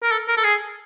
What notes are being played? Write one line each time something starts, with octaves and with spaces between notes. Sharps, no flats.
A#4
A4
A#4
A4
G#4